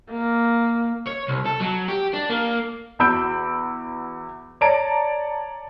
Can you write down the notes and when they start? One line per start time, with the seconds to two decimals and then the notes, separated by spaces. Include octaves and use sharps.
0.11 A#3
1.07 C#5
1.28 C2
1.46 A4
1.60 F#3
1.88 G4
2.13 D4
2.30 A#3
2.99 E2 F#4 B5 E6 G6 D7
4.61 C#5 D5 A5 A#5 D7